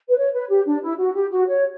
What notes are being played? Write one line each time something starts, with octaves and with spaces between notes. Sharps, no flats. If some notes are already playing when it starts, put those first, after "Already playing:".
B4
C#5
B4
G4
D4
E4
F#4
G4
F#4
C#5